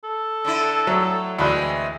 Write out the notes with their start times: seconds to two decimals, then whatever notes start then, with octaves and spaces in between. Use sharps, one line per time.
0.04 A4
0.45 D3 D4 E4
0.87 A2 F#3
1.39 D2 E3 G#3 C4 B5 F#6